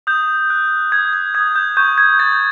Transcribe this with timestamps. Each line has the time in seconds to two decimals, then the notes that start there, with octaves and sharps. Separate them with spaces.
0.07 D#6 G6
0.50 F#6
0.92 D#6 G#6
1.13 G#6
1.35 D#6 G#6
1.56 G6
1.77 C#6 G6
1.98 G#6
2.19 G6 A6